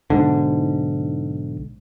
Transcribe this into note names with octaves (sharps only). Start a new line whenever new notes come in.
B1 G#2 D3